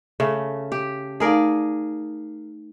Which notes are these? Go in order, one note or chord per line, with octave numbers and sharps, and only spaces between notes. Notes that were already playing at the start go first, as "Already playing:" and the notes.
C#3 A3
G4
A3 D#4 G#4 A#4 D5 F5